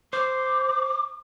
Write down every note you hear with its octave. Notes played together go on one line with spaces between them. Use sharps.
C5 D6